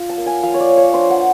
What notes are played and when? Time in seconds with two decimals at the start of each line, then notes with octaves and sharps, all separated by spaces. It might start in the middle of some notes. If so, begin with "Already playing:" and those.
Already playing: F4
0.09 A5
0.18 A#3
0.26 G#5
0.43 F3 F5
0.54 C#5
0.60 D5
0.69 A#3
0.77 C#5
0.93 D4 C5
1.10 F#5